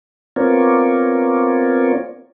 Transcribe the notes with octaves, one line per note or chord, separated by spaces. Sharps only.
B3 C4 F4 A#4 C#5 D5